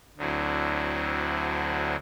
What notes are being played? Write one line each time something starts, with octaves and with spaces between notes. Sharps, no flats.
D2 D3 F#3 C4 E4